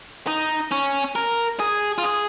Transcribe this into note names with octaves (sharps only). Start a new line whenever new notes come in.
D#4
C#4
A#4
G#4
F4
G#4